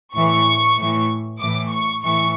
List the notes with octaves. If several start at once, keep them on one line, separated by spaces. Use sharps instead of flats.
A2 E3 C#6
A2 E3
A2 E3 D6
C#6
A2 E3 C#6